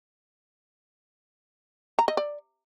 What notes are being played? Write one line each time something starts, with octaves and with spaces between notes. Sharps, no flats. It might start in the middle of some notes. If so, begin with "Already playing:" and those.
A#5
D#5
D5